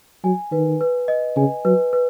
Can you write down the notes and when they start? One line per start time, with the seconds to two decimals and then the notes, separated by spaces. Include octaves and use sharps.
0.24 F#3 G#5
0.51 D#3 B4
0.81 B4
1.08 D#5
1.36 C#3 G#5
1.65 F#3 B4
1.93 B4